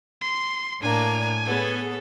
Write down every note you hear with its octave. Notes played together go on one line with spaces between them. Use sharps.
C6
A2 A#3 D4 G#5 A#5
B3 G#4 A4 C#5